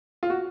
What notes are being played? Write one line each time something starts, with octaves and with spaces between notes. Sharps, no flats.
F4
F#4